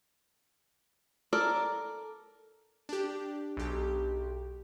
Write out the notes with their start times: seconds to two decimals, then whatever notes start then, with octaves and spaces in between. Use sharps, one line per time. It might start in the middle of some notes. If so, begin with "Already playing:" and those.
1.33 A4 A#4 D5
2.89 D4 G4
3.57 B1 G4